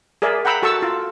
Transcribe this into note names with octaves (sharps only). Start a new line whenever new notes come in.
G#4 A#4 D5 E5
F#5 G5 A#5 B5 E6
F#4 A4 A5 C#6 E6
F4